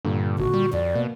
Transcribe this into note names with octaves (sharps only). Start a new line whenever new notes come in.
G2 A#2 D3
G#1 F#4
G3
F2 D5
B2 A#3